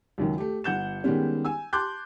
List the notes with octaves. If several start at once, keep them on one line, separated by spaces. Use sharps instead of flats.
C#2 F#2 D#3
A3 G4
G1 F#5 G6 E7
D#3 G3 G#3 B3 C#4
G#5 E6
A5 C6 D6 F#6 G6